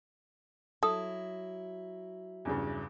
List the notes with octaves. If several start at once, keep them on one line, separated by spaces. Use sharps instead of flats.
F#3 E4 A4 D#6
E2 G2 C#3